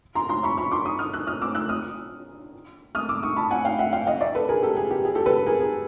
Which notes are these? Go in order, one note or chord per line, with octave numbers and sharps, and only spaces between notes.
A#5 C6
A#5 C6
B5 C#6
B5 C#6
C6 D6
C#6 D#6
D#6 F6
E6 F#6
D#6 F6
D6 E6
E6 F#6
D#6 F6
D#6 F6
D6 E6
C#6 D#6
A5 B5
F#5 G#5
F5 G5
E5 F#5
F5 G5
D#5 F5
D5 E5
A4 B4
G#4 A#4
G4 A4
G#4
G4
G#4
G4 A4
A4 B4
G#4 A#4
G#4